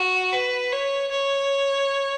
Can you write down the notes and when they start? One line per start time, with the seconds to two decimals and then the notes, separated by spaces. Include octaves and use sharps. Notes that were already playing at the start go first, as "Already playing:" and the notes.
Already playing: F#4
0.32 B4
0.72 C#5
1.10 C#5